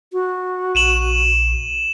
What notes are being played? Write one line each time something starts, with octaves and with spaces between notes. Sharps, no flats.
F#4
A#1 D#7 E7 F#7